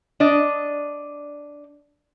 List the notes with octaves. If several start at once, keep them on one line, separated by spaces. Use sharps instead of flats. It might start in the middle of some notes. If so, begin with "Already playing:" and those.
D4 D5 D#5